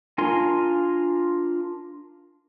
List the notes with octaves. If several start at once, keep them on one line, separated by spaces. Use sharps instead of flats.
D4 F4 A#4 G#5 C6